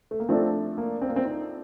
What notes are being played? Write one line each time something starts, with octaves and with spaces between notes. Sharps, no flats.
A3
A#3
F3 A3 C4 D4 A4
A#3
C4
A#3
C4
D#4